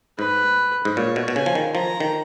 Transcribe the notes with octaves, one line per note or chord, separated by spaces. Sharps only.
G#2 B4
G#2
A#2 C#5
B2
B2
C#3 G#5
F3
D#3
F3 A#5
D#3